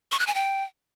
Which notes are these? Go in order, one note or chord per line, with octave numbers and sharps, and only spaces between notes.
C#6
F#6
G#5
G5